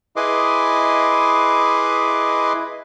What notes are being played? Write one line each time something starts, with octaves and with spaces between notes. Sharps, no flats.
E4 G#4 B4 D#5 C6 D6